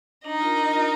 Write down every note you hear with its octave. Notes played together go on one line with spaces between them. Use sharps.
D4 D#4 D#5
F4 A#4
D4
F4 A#4